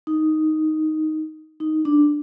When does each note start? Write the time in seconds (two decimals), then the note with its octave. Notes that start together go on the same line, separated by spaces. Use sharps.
0.07 D#4
1.60 D#4
1.85 D4